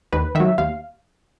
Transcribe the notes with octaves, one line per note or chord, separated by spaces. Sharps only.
D#2 B4
D#3 F#3 E5
D#2 F5